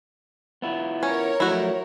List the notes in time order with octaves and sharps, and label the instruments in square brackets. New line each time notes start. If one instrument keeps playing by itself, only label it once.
[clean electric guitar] B3 E4 F4
[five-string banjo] C#4 [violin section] A#4 C#5
[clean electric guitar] F3 F#3 A3 [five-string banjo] E4 F#4